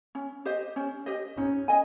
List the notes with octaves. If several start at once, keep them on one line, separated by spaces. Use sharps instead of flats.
C#4
G4 C5 D#5
C#4
G4 C5 D#5
C#4 D#4
D#5 G#5